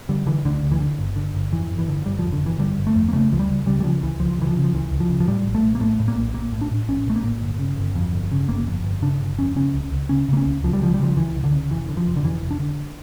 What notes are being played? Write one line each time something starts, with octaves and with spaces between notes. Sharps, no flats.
D3 G3
D3 E3
D2 D3
D2
E3
D3
G1
D3
G1
F2 E3
G1
E3
D3
G1 G3
F3
F2
D3
G1 E3
D3 G3
G1
A3
F2
A#3
C#3 A3
C#2 F3
G3
C#2
C#3 G3
G3
C#3 F3
C#2 E3
C#2 F3
C#3 E3
F3
C#3
F3
C#2 E3
C#2
F3
C#3
F3
A2 G3
A#1
A3
A#1
A#3
A2 A3
A2
A#3
A#1
A#1 A#3
A2
D4
A2
A#1 C#4
A#1 A3
A#3
A2
G1
C#3
G1
F2
G1
C#3
G1 A#3
F2
G1
C#3 D4
G1
F2 C#4
C#3 C#4
C#2
C#2
C#3 C#4
C#3 A#3
C#4
C#2
C#2 F3
G3
C#3 F3
G3
C#3 F3
C#2 E3
C#2
D3
C#3
F1 E3
D3
F3
F1
D3
F2 E3
F1
D4
D3